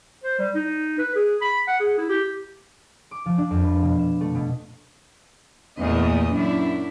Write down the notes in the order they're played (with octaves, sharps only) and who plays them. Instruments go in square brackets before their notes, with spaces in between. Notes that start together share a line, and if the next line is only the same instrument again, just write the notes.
[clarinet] C5
G3
D#4
B4
G#4
B5
F#5
G#4
E4
G4
[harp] D6
F3
D4
F2
B4
B2
E7
A3
B2
[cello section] E2 A#2 E3 A3 D#5
F#2 D4 E4